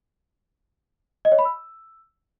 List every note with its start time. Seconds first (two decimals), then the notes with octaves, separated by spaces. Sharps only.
1.25 D#5
1.32 C#5
1.38 B5
1.45 E6